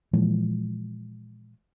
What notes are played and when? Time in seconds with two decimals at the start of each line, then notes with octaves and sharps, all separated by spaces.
0.13 A#2 E3 F3 G#3